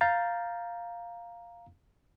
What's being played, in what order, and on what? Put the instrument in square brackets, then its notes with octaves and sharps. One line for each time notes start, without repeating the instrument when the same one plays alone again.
[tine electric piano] F5 A#5 G6 A6